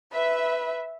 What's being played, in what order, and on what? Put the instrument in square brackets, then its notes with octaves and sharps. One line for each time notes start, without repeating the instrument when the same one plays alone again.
[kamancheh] B4 [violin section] E5